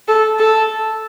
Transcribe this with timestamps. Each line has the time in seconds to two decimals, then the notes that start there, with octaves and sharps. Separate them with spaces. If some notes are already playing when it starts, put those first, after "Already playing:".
0.08 A4
0.39 A4